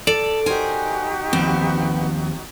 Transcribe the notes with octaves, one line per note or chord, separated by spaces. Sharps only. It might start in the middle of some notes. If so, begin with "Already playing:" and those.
A4 D5
D#4 F#4 G4 A#4 C5 G#5
D#2 F3 B3 C4